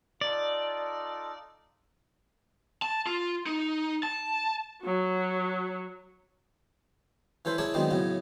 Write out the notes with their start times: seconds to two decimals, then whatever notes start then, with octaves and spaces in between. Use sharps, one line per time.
0.21 D#4 F4 A4 D5
2.82 A5
3.07 F4
3.46 D#4
4.03 A5
4.85 F#3 F#4
7.45 E3 C#4 A4 B4 C5
7.58 E4 G#4 A#4 C#5 D5 A5
7.74 D#3 F#3 G#3 B3 C4 D4
7.91 A2 C#3 F#3 B3